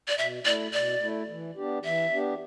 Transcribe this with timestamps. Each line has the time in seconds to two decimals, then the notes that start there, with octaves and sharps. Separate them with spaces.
0.08 D5
0.17 B2 E5
0.45 A3 E4 D5
0.73 B2 D5
1.01 A3 E4
1.29 E3
1.56 B3 D4 G4
1.84 E3 E5
2.12 B3 D4 G4